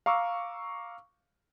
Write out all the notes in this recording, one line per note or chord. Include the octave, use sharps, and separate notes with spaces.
F5 A#5 C#6 D6 E6